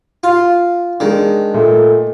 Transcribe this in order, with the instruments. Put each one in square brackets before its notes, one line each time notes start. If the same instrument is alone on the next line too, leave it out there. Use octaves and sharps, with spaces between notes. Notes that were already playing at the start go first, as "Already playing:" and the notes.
[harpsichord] F4
[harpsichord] D#3 [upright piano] G#3 D4
[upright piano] A#2 A3